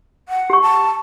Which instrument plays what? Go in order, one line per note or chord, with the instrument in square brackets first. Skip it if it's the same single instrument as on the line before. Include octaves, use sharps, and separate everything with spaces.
[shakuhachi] F#5
[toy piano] G4 C#6
[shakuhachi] A5